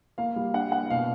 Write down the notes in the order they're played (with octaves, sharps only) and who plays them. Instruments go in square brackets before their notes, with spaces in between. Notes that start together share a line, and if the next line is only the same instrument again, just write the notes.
[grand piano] A#3 F5
G3
D4 F#5
A#3 F#5
B2 F5